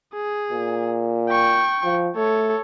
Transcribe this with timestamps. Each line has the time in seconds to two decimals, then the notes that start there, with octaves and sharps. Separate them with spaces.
0.14 G#4
0.52 A#2
1.29 G5 C#6
1.84 F3
2.16 A3 A4 C#5